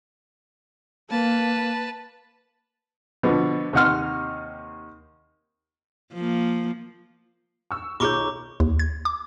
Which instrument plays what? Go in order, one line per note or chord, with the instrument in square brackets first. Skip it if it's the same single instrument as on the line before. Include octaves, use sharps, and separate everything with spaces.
[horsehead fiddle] A#3 [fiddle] B4 A5
[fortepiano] B2 D3 F3 B3
D#2 C3 D#4 F#5 C6 F6
[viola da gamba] F3 A#3
[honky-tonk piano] C#6 E6
[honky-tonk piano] B1 D#3 [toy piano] F4 G#4 C#5 [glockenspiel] A#5 C#6 D6
[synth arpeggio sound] D#2
G#6
D6